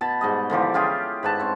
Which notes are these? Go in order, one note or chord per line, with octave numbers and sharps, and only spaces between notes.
B2 A5 B5
G#2 G3 D#5
D3 E3 F3 G4
C#4 F4 G4 G#4
G#2 B4 A5
C4 C#5